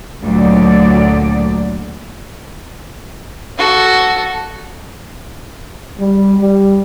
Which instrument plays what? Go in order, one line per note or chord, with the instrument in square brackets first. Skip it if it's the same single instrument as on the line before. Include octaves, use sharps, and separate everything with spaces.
[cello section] D2 A#2 D3 F#3 D5
[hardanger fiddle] F#4 A4
[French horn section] G3
G3